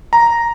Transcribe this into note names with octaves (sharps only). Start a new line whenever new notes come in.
A#5